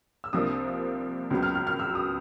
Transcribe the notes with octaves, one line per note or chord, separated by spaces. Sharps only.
E6
C2 C3 F3 A#3 D4 D#6
C#2 C#3 F#3 B3
F6
F6
F6
E6
D#6